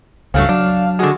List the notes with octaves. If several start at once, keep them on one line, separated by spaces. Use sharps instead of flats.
C#2 G2 F#3 A3 C#4 F5
F#3 D4
D3 G#3 F#4